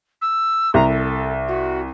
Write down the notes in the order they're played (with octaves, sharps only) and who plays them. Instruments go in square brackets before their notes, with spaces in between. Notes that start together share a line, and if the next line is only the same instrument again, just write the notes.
[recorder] E6
[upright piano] C2 [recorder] A#5
[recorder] A4
F#4